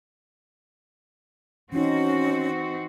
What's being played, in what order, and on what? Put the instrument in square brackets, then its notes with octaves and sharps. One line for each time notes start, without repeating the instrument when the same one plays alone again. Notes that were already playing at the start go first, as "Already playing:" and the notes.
[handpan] E3 D#4 [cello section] C4 F#4 [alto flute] C#4